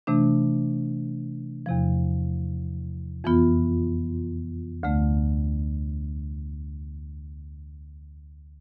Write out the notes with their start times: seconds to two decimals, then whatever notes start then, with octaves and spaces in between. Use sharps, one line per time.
0.07 C3 E3 A3 D4
1.66 E2 C3 F3
3.24 F2 E3 B3 F4
4.83 D2 D3 A3